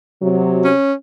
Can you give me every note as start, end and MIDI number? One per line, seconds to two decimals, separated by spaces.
0.22 0.71 48
0.22 0.71 54
0.64 0.93 61